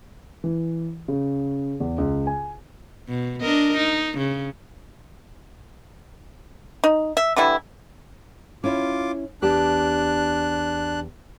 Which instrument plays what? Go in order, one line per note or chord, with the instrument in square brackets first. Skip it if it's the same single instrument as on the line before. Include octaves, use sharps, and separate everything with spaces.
[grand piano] E3
C#3
E2
C#2
G#5
[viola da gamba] B2
D4 A#4 D#5
D#4
C#3
[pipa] D#4
E5
D3 E3 G3 E4
[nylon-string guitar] C#4 E4 [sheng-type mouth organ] F4 D6
[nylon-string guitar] E2 G4 A5 [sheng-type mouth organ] D4 F#6